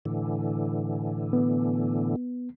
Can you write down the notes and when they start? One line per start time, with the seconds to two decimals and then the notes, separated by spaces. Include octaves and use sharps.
0.05 A2 D3 E3
1.33 B3